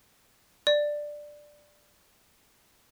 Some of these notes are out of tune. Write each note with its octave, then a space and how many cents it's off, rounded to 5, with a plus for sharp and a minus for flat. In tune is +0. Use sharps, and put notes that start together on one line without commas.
D5 +10